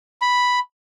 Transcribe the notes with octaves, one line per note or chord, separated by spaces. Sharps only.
B5